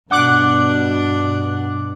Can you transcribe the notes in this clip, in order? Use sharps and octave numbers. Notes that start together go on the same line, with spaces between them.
G2 B2 D4 F#5 D6 F#6